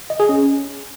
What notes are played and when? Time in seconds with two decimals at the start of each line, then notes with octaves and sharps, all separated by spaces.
0.10 D#5
0.20 G#4
0.29 C#4